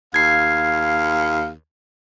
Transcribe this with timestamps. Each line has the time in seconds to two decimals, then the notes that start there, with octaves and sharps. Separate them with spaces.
0.14 D#2 F5 G#6 C7